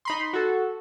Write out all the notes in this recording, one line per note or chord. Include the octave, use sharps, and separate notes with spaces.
D#4 B5 C6
F#4 A4